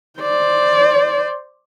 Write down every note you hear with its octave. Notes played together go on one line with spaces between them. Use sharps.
C5 D5